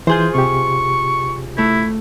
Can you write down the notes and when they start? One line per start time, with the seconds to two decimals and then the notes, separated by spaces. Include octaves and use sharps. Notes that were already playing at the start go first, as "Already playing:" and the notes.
0.07 E3 F4 G#4 C5 C6 G6
0.35 C3 G4 C#6
1.58 A3 E4